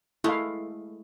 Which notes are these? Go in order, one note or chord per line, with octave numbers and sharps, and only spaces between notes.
G#3 A3 E4 F5